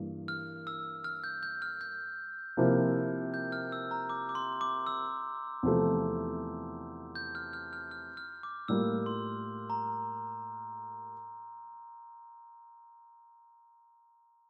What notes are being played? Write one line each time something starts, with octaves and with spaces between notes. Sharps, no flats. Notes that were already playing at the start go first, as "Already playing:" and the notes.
Already playing: G2 E3 A#3
F6
E6
F6
G6
G6
F6
G6
C3 F3 A#3 E4
G6
F6
E6
A#5
D6
D6
C6
D6
E6
E2 C3 F3 A3
G6
F6
F6
F6
F6
F6
D6
A2 G3 A#3 F4 E6
C6
A#5